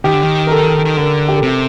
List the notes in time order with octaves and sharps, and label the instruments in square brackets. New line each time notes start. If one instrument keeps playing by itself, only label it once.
[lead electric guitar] D#3 [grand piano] G4
[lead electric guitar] D3
D#3
[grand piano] A#4
A4
[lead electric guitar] D#3
[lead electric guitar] D3 [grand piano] A#4
[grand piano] G4
A4
[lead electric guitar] C3 [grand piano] G4